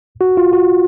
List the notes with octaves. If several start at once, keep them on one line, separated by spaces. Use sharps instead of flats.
F#4
F4
F#4